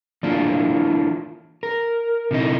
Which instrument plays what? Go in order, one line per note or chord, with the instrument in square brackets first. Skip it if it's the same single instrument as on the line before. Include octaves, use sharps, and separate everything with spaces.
[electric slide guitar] E3 A#3 D4 E4 F4
A#4
C3 E3 D#4